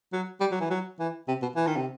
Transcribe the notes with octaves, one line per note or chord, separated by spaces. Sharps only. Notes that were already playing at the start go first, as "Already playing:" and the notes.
F#3
G3
F#3
E3
F#3
E3
C3
B2
E3
D#3
C3